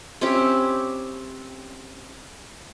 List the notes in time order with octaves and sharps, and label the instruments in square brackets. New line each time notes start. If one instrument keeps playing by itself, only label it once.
[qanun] C4 C#4 E4 G4